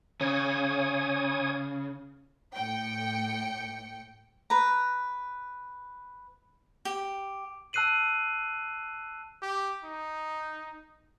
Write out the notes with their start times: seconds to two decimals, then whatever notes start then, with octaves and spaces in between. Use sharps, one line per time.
0.21 C#3 C#5 G#5 D#6
2.57 A2 G5 C#7
4.50 B4 A#5
6.85 G4
7.73 A5 E6 F#6 C7 D#7 F#7
9.42 G4
9.84 D#4